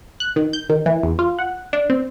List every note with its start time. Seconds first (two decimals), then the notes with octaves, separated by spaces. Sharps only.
0.20 F#6
0.36 D#3
0.53 G6
0.69 D#3
0.86 E3
1.03 E2
1.19 F4
1.39 F#5
1.73 D4
1.90 C4